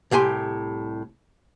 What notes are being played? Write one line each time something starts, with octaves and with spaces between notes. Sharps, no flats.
C2 A2 G4 G#5 C6